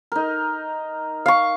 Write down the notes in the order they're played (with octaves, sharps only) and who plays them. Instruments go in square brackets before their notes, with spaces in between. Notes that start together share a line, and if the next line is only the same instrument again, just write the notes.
[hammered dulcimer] D#4 A#4
[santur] F5 C#6